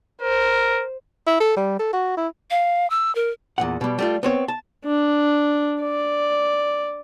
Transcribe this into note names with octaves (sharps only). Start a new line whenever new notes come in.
A#4 C5
E4
A4
G3
A4
F#4
E4
F5
E6
A#4
E2 A#2 F#5
B2 G3
G3 A3 F4
B3 C4 C#5
A5
D4
D5